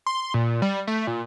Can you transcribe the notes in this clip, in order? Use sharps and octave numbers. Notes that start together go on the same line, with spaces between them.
C6
A#2
G3
A3
A#2